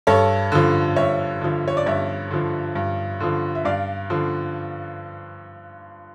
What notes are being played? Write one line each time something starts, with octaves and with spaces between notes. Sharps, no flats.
G2 A4 C#5
D3 F3
G2 C#5 E5
D3 F3
C#5
D5
G2 C#5 E5
D3 F3
G2
D3 F3
E5
G2 D5 F5
D3 F3